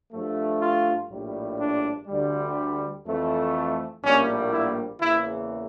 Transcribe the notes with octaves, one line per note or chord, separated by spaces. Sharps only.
G2 F3 A3
F4
A#1 A2 G3
D4
D2 D3 G3
F2 E3 A3
A#1 A2 G3 A#3 C#4
E4
E2 C#3 E3 A#3 E4